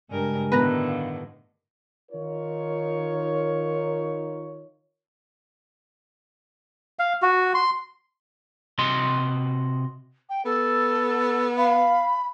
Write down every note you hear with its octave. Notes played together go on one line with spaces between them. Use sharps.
G2 C#3 G#3 A#4 G#5
A2 D3 D#3 B3 B4 A#5
F5 F#5
D#3 D#4 F4 A#4 C#5
F5
F#4
C6
C3 F#4 D#5 C6
G5
B3 A4
F5 B5